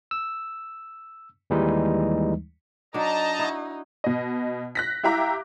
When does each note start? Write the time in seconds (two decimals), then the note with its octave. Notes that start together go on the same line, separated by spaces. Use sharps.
0.11 E6
1.50 D#2 E3 G3 G#3 D#4
2.94 F#3 D4 D#4 D#5 A5 A#5
3.39 E4 F#4
4.04 B2 D#5
4.75 F#6 A#6 B6
5.03 E4 G4 E5 F5 A#5 D6